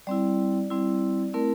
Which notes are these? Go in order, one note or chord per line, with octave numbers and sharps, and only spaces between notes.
G3 C4 E4 D5
G3 C4 E4
A3 C4 E4 A#4